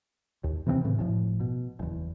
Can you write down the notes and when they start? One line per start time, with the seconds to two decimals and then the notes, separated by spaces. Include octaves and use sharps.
0.44 D#2
0.66 C3 E3 A3 C4
0.85 A2 C#3 E3
0.98 F#1 A2 F3
1.40 B2
1.79 F#1 E2